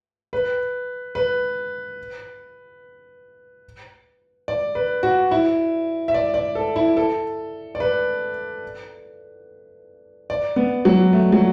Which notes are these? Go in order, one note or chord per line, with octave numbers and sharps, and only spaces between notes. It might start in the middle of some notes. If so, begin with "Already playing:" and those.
B4
B4
D5
B4
F#4
E4
E5
D5
D5
A4
E4
A4
D5
B4
D5
B3
F#3
A3
F#3